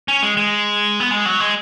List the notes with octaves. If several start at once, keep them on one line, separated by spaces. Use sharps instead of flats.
C#4
G#3
G#3
B3
G#3
F#3
G#3